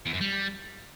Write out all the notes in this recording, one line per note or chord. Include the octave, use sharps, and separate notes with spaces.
E2
F#2
G3